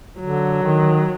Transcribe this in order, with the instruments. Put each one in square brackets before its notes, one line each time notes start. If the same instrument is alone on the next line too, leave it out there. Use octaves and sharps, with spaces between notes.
[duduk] D3 [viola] F#3
[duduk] D#3